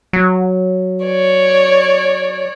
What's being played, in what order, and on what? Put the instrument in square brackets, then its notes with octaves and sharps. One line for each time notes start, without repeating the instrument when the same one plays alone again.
[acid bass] F#3
[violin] C#5 D5